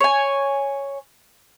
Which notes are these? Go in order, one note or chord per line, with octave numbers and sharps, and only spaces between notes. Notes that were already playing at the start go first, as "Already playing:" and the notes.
C#5 G#5